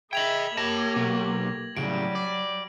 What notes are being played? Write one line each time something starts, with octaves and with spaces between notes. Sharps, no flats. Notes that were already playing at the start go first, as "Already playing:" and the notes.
G#4 D#5 E5 G5 B5 G#6 F7 F#7
A#3 G4 C#5 A5 A#6
B1 F#3
A2 C#3 F#3 G3 D7
D5